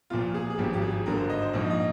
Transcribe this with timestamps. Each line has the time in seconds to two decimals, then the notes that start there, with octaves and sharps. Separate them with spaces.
0.10 C2 A#2 F3 F4
0.34 G#4
0.50 G#4
0.58 G#1 G2 F3 G4
0.73 G4
0.82 G#4
1.06 G#1 G2 D3 A#4
1.18 C5
1.30 D#5
1.42 C5
1.53 A#1 G#2 F3 D#5
1.70 D#5